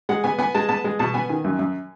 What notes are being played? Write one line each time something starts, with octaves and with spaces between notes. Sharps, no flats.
G#3 F#5
B3 G#5
B3 G#5
G#3 A5
B3 A5
G#3
B2 A5
B3 G#5
D#3 G#5
F#2
F#2